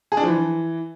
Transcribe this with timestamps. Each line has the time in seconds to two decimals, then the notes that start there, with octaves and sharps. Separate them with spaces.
0.12 G#4
0.17 D4
0.23 F3
0.28 E3